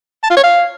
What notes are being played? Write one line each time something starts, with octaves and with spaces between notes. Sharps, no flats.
A5
F4
C#5
F5